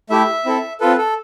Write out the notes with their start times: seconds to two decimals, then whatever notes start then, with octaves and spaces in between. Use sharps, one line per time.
0.10 A3 E4 G4 E5
0.45 C4 E4 A4
0.80 C4 F4 A4 B4
0.98 A4